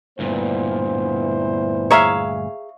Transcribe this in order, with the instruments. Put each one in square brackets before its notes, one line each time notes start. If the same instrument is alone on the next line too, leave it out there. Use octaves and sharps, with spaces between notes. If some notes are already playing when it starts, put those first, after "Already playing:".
[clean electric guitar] D2 G2 A#2 [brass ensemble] B3 E4 C5
[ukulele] G#4 A#5 [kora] C#5 E5 F5